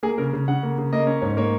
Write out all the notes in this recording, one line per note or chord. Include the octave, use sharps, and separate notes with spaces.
A#3 G#4
C#3 A#4
C#3
C#3 F#5
A#3
C#3
A#3 D#5
C#4
G#2 C#5
A#3 C#5